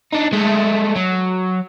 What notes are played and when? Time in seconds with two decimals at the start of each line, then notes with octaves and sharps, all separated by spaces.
0.13 D4 D#4
0.33 G#3 A3
0.96 F#3